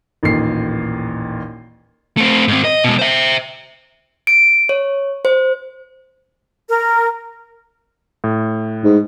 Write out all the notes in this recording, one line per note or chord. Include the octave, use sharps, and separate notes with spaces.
A1 D#2 A#2 C7
A3 C4
G#2 C4
D#5
B2 G#3
C5 E5
D7
C#5
C5
A#4
A2
G#2